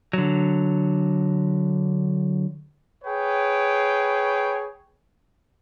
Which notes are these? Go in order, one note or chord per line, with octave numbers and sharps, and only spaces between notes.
D3 F#3
G#4 B4 C#5 G5